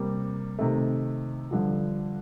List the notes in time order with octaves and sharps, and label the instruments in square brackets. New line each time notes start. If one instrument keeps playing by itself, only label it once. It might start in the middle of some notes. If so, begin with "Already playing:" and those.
Already playing: [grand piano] C3 G3 A#3
C3 D#3 A3
G2 D3 F3